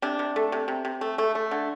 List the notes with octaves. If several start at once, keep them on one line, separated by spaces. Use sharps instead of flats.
C3 D4
C3
A3
C3
C3
C3
A3
A3
A3
D3